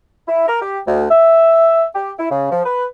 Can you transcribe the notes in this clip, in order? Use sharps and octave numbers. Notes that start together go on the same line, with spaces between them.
E4
A#4
G4
D2
E5
G4
E4
C#3
F3
B4